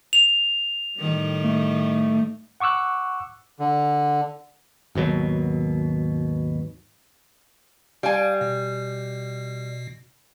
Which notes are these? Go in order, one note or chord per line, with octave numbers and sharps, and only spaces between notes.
F7
A2 D#3 G3
A3
F#5 C#6 D6 E6 F#6
D3
G#1 D#2 B2 F#3
G3 F5 G#5
B2